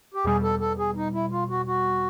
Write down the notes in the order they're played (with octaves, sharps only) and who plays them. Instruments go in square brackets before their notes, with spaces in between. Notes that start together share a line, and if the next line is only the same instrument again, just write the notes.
[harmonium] G4
[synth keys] E2 B2 G3 [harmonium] G#4
[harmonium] A4
A4
G#4
D#4
E4
F4
F#4
F#4